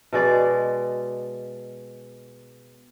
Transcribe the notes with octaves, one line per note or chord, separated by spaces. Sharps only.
B2 G#3 D5